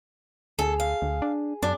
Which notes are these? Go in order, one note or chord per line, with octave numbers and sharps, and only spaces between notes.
D2 G#4 A4
F5
D2
D4
F#2 D4 D5